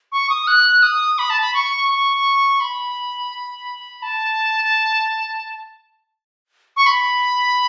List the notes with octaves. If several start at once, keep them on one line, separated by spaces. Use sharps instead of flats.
C#6
D#6
F#6
D#6
B5
A5
B5
C#6
C#6
B5
A5
C#6
B5